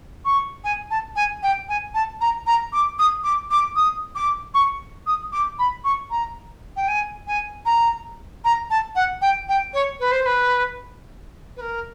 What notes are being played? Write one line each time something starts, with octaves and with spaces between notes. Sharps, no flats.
C#6
G#5
A5
G#5
G5
G#5
A5
A#5
A#5
D6
D#6
D6
D6
D#6
D6
C#6
D#6
D6
B5
C#6
A#5
G5
G#5
G#5
A#5
A#5
A5
F#5
G5
G5
C#5
B4
C5
C5
B4
B4
A#4